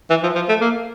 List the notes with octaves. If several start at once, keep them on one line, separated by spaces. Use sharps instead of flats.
E3
F3
F3
A3
A#3